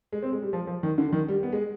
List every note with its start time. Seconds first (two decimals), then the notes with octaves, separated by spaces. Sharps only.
0.12 G#3
0.23 C4
0.32 G#3
0.42 G3
0.53 F3
0.67 F3
0.83 D#3
0.98 D3
1.12 D#3
1.28 G3
1.43 B3
1.52 G#3